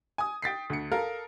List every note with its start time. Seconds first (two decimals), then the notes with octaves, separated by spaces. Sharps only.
0.18 G#5 D#6
0.42 G5 A6 B6 C7
0.70 D2 C#7
0.92 A4 A#4 F5 A#5